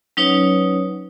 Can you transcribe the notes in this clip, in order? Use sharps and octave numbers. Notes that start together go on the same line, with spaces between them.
F#3 C#4 D#4 B4 C#5